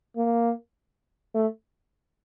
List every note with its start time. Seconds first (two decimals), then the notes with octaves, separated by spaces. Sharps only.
0.17 A#3
1.34 A3